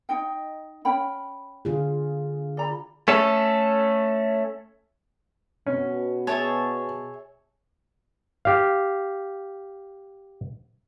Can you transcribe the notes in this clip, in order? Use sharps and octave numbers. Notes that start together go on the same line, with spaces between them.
D#4 D#5 G5
C#4 G5 B5
D3 F4 G#4
D5 A#5 B5
A3 C#4 A4
B2 C#4
G#4 C#5 E5 A5
G4 F5